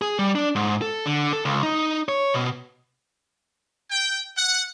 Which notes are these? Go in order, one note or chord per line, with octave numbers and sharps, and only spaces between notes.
G#4
G3
D4
G#2
A4
D3
A4
C#2
D#4
C#5
B2
G5
F#5